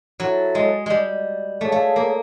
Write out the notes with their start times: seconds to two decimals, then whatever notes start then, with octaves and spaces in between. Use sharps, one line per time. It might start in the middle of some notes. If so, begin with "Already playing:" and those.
0.20 F#3 E4 A4 C#5 E5
0.55 G#3
0.86 G3 G#3
1.61 A3 G#4 C#5 F5
1.72 A3
1.96 A#3